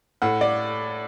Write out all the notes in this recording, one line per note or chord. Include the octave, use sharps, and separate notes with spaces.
A2 F#5
D5